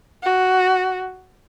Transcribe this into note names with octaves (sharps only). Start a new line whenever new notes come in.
F#4